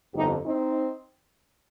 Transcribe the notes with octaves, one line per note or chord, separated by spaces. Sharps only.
G1 F2 D3 D#4 G4
C4 D#4